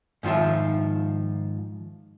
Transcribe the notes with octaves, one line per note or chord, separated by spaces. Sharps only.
G#2 D#3 F3 F4 E5